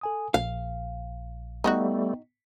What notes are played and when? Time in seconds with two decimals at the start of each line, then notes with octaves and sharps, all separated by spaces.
0.01 A4 G#5 D#6
0.34 A#1 F5
1.64 G3 A3 B3 D#4 F4 F#4 G5